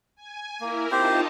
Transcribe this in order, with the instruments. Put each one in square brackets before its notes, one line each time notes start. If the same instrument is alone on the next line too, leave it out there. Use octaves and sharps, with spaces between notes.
[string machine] G#5
[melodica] A#3 [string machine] E4 A#4
[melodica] C4 G4 C5 [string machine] D#4 F4 A5